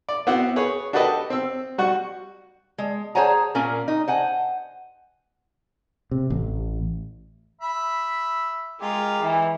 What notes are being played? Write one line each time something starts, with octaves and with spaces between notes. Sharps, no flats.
D5
B3 C4 E4 F#4 C5 F#5
G#4 B4 C#5
D4 F#4 G4 A4 B4 D#5
C4 E6
G3 F#4 F#5 C#6
G#3
G#4 C5 C#5 F#5 G#5 A#5
A#2 C#4 A#4 F5 G#5
D#4
C5 F#5 G#5
C3
A1
E5 B5
G#3 F4 G4 A#4
E3